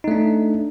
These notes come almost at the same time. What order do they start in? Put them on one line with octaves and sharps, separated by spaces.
D#4 A3 D4